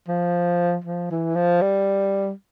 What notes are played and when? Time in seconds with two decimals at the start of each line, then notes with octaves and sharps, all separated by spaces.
0.08 F3
0.84 F3
1.11 E3
1.36 F3
1.62 G3